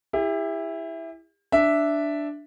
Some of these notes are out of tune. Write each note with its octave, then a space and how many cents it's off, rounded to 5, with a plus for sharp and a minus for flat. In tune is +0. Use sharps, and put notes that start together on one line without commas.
E4 +0 G4 +40
D4 +0 E5 +0